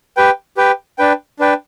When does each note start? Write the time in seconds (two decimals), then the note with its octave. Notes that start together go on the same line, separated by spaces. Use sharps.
0.17 G4 B4 G5
0.57 G4 B4 G5
0.98 D4 B4 G5
1.39 D4 B4 G5